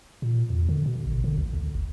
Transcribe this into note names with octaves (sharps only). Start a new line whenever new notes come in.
A#2
E2
D3
B2
A1
D3
D2
D2
G1